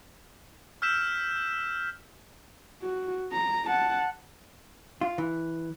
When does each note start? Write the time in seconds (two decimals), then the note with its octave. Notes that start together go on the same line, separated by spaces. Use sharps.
0.82 E6 F6 G6 B6 E7
2.82 F#4
3.32 A#5
3.67 F#5 A5
5.01 F4
5.18 E3